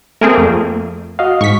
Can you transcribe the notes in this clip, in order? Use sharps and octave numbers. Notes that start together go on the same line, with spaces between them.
A3 C4 G#4 A#4
F2 A#3
F#4 D#5 F5
G#2 C#6 B6